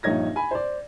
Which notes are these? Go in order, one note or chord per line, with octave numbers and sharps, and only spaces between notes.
A#1 G2 D#4 C#5 G#6 A#6
G#5 B5
C5 D5